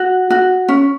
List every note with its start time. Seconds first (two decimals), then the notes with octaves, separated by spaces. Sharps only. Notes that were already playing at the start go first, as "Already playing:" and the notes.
Already playing: F#4
0.30 F#4
0.69 C#4